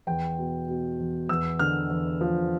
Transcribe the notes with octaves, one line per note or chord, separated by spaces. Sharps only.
E2 G5
B2
B2
E2
E2 E6
D3 F6
E2
F3